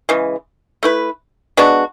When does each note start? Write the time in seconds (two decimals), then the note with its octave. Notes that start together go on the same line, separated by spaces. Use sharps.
0.09 C#3 E3 G#3
0.83 A3 E4 B4
1.57 G#3 B3 D4 F#4